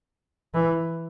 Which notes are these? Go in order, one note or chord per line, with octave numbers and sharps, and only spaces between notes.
E3